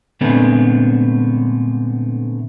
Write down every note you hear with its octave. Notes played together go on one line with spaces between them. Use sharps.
A#2 D3 G#3 A3 B3 C4